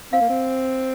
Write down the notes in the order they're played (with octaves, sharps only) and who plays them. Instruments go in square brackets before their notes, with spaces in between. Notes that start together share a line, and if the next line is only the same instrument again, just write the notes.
[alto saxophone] C4 [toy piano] F5
[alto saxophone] A#3
C4